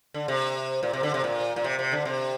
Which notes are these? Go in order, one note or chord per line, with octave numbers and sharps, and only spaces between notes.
D3
C3
A#2
C3
D3
C3
A#2
A#2
C3
C3
D3
C3